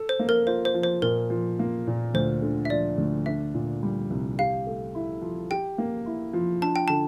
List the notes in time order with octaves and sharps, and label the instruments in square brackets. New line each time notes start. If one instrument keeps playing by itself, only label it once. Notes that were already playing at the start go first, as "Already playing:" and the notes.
Already playing: [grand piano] A4
[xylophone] C5
[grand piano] A#3
[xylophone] A#4
[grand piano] F4 [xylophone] C5
[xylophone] C5
[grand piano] F3
[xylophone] C5
[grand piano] A#2 [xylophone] A#4
[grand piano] F3
A#3
A#2
[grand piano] D2 [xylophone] C5
[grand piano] D3
[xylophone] E5
[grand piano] F3 [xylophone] D5
[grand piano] D2
[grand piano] D4 [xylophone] E5
[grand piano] A#2
G3
C2
[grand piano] G4 [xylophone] F5
[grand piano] A3
E4
F3
[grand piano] G4 [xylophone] G5
[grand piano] A#3
E4
F3
[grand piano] D4 [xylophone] A5
[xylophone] G5
[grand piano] D3 [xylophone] A5